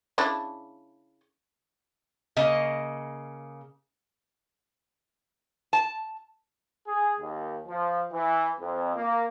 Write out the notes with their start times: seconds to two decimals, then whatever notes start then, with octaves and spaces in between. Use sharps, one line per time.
0.18 C#3 D4 E4
2.36 C#3 A#3 D#5
5.73 A5
6.87 G#4
7.19 D#2
7.67 F3
8.12 E3
8.59 F2
8.96 A#3